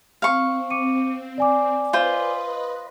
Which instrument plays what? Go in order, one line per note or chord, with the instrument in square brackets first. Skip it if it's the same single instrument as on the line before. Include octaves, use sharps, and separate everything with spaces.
[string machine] C4 [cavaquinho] F5 C#6
[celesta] D6 C#7 D#7
D5 G#5 D6
[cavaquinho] F4 C5 [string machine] B4 D#5